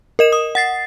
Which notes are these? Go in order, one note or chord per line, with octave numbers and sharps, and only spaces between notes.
A#4 D#5 E7
D#6
F#5 A6 C7